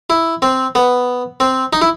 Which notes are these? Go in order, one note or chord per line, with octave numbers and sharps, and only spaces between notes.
E4
C4
B3
C4
D#4
E4